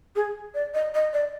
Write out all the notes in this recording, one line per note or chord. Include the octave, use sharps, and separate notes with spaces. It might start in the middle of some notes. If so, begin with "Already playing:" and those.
G#4
D5
D#5
D#5
D5